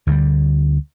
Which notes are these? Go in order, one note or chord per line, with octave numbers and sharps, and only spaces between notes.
D2 D3 F3 G3